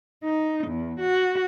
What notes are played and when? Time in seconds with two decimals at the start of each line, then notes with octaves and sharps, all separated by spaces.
0.24 D#4
0.67 E2
1.00 F#4